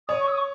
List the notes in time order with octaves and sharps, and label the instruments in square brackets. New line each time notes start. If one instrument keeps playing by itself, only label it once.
[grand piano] C#5 [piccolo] D#6
[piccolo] C#6
E6
D#6
C#6